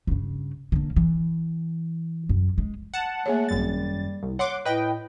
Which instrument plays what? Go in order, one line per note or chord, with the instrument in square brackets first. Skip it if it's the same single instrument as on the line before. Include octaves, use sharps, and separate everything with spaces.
[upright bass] G2 C#3
D3 A#3
E3
F#2
G#3
[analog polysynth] F#5 A5
[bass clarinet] A3 [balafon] A#3 G#4 C#5
[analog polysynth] G#1 F#2 A6 [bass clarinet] G3
[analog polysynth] C2
[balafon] C#5 [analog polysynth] F#5 C6 D6
[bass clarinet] A2 [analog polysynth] B4 D#5 G5